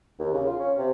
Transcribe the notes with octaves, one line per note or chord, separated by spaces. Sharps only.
D#2
C#3
F4
C#4
C3